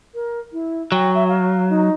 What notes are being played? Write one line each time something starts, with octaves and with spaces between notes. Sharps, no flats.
A#4
E4
F#3 G5
E5
F5
D#4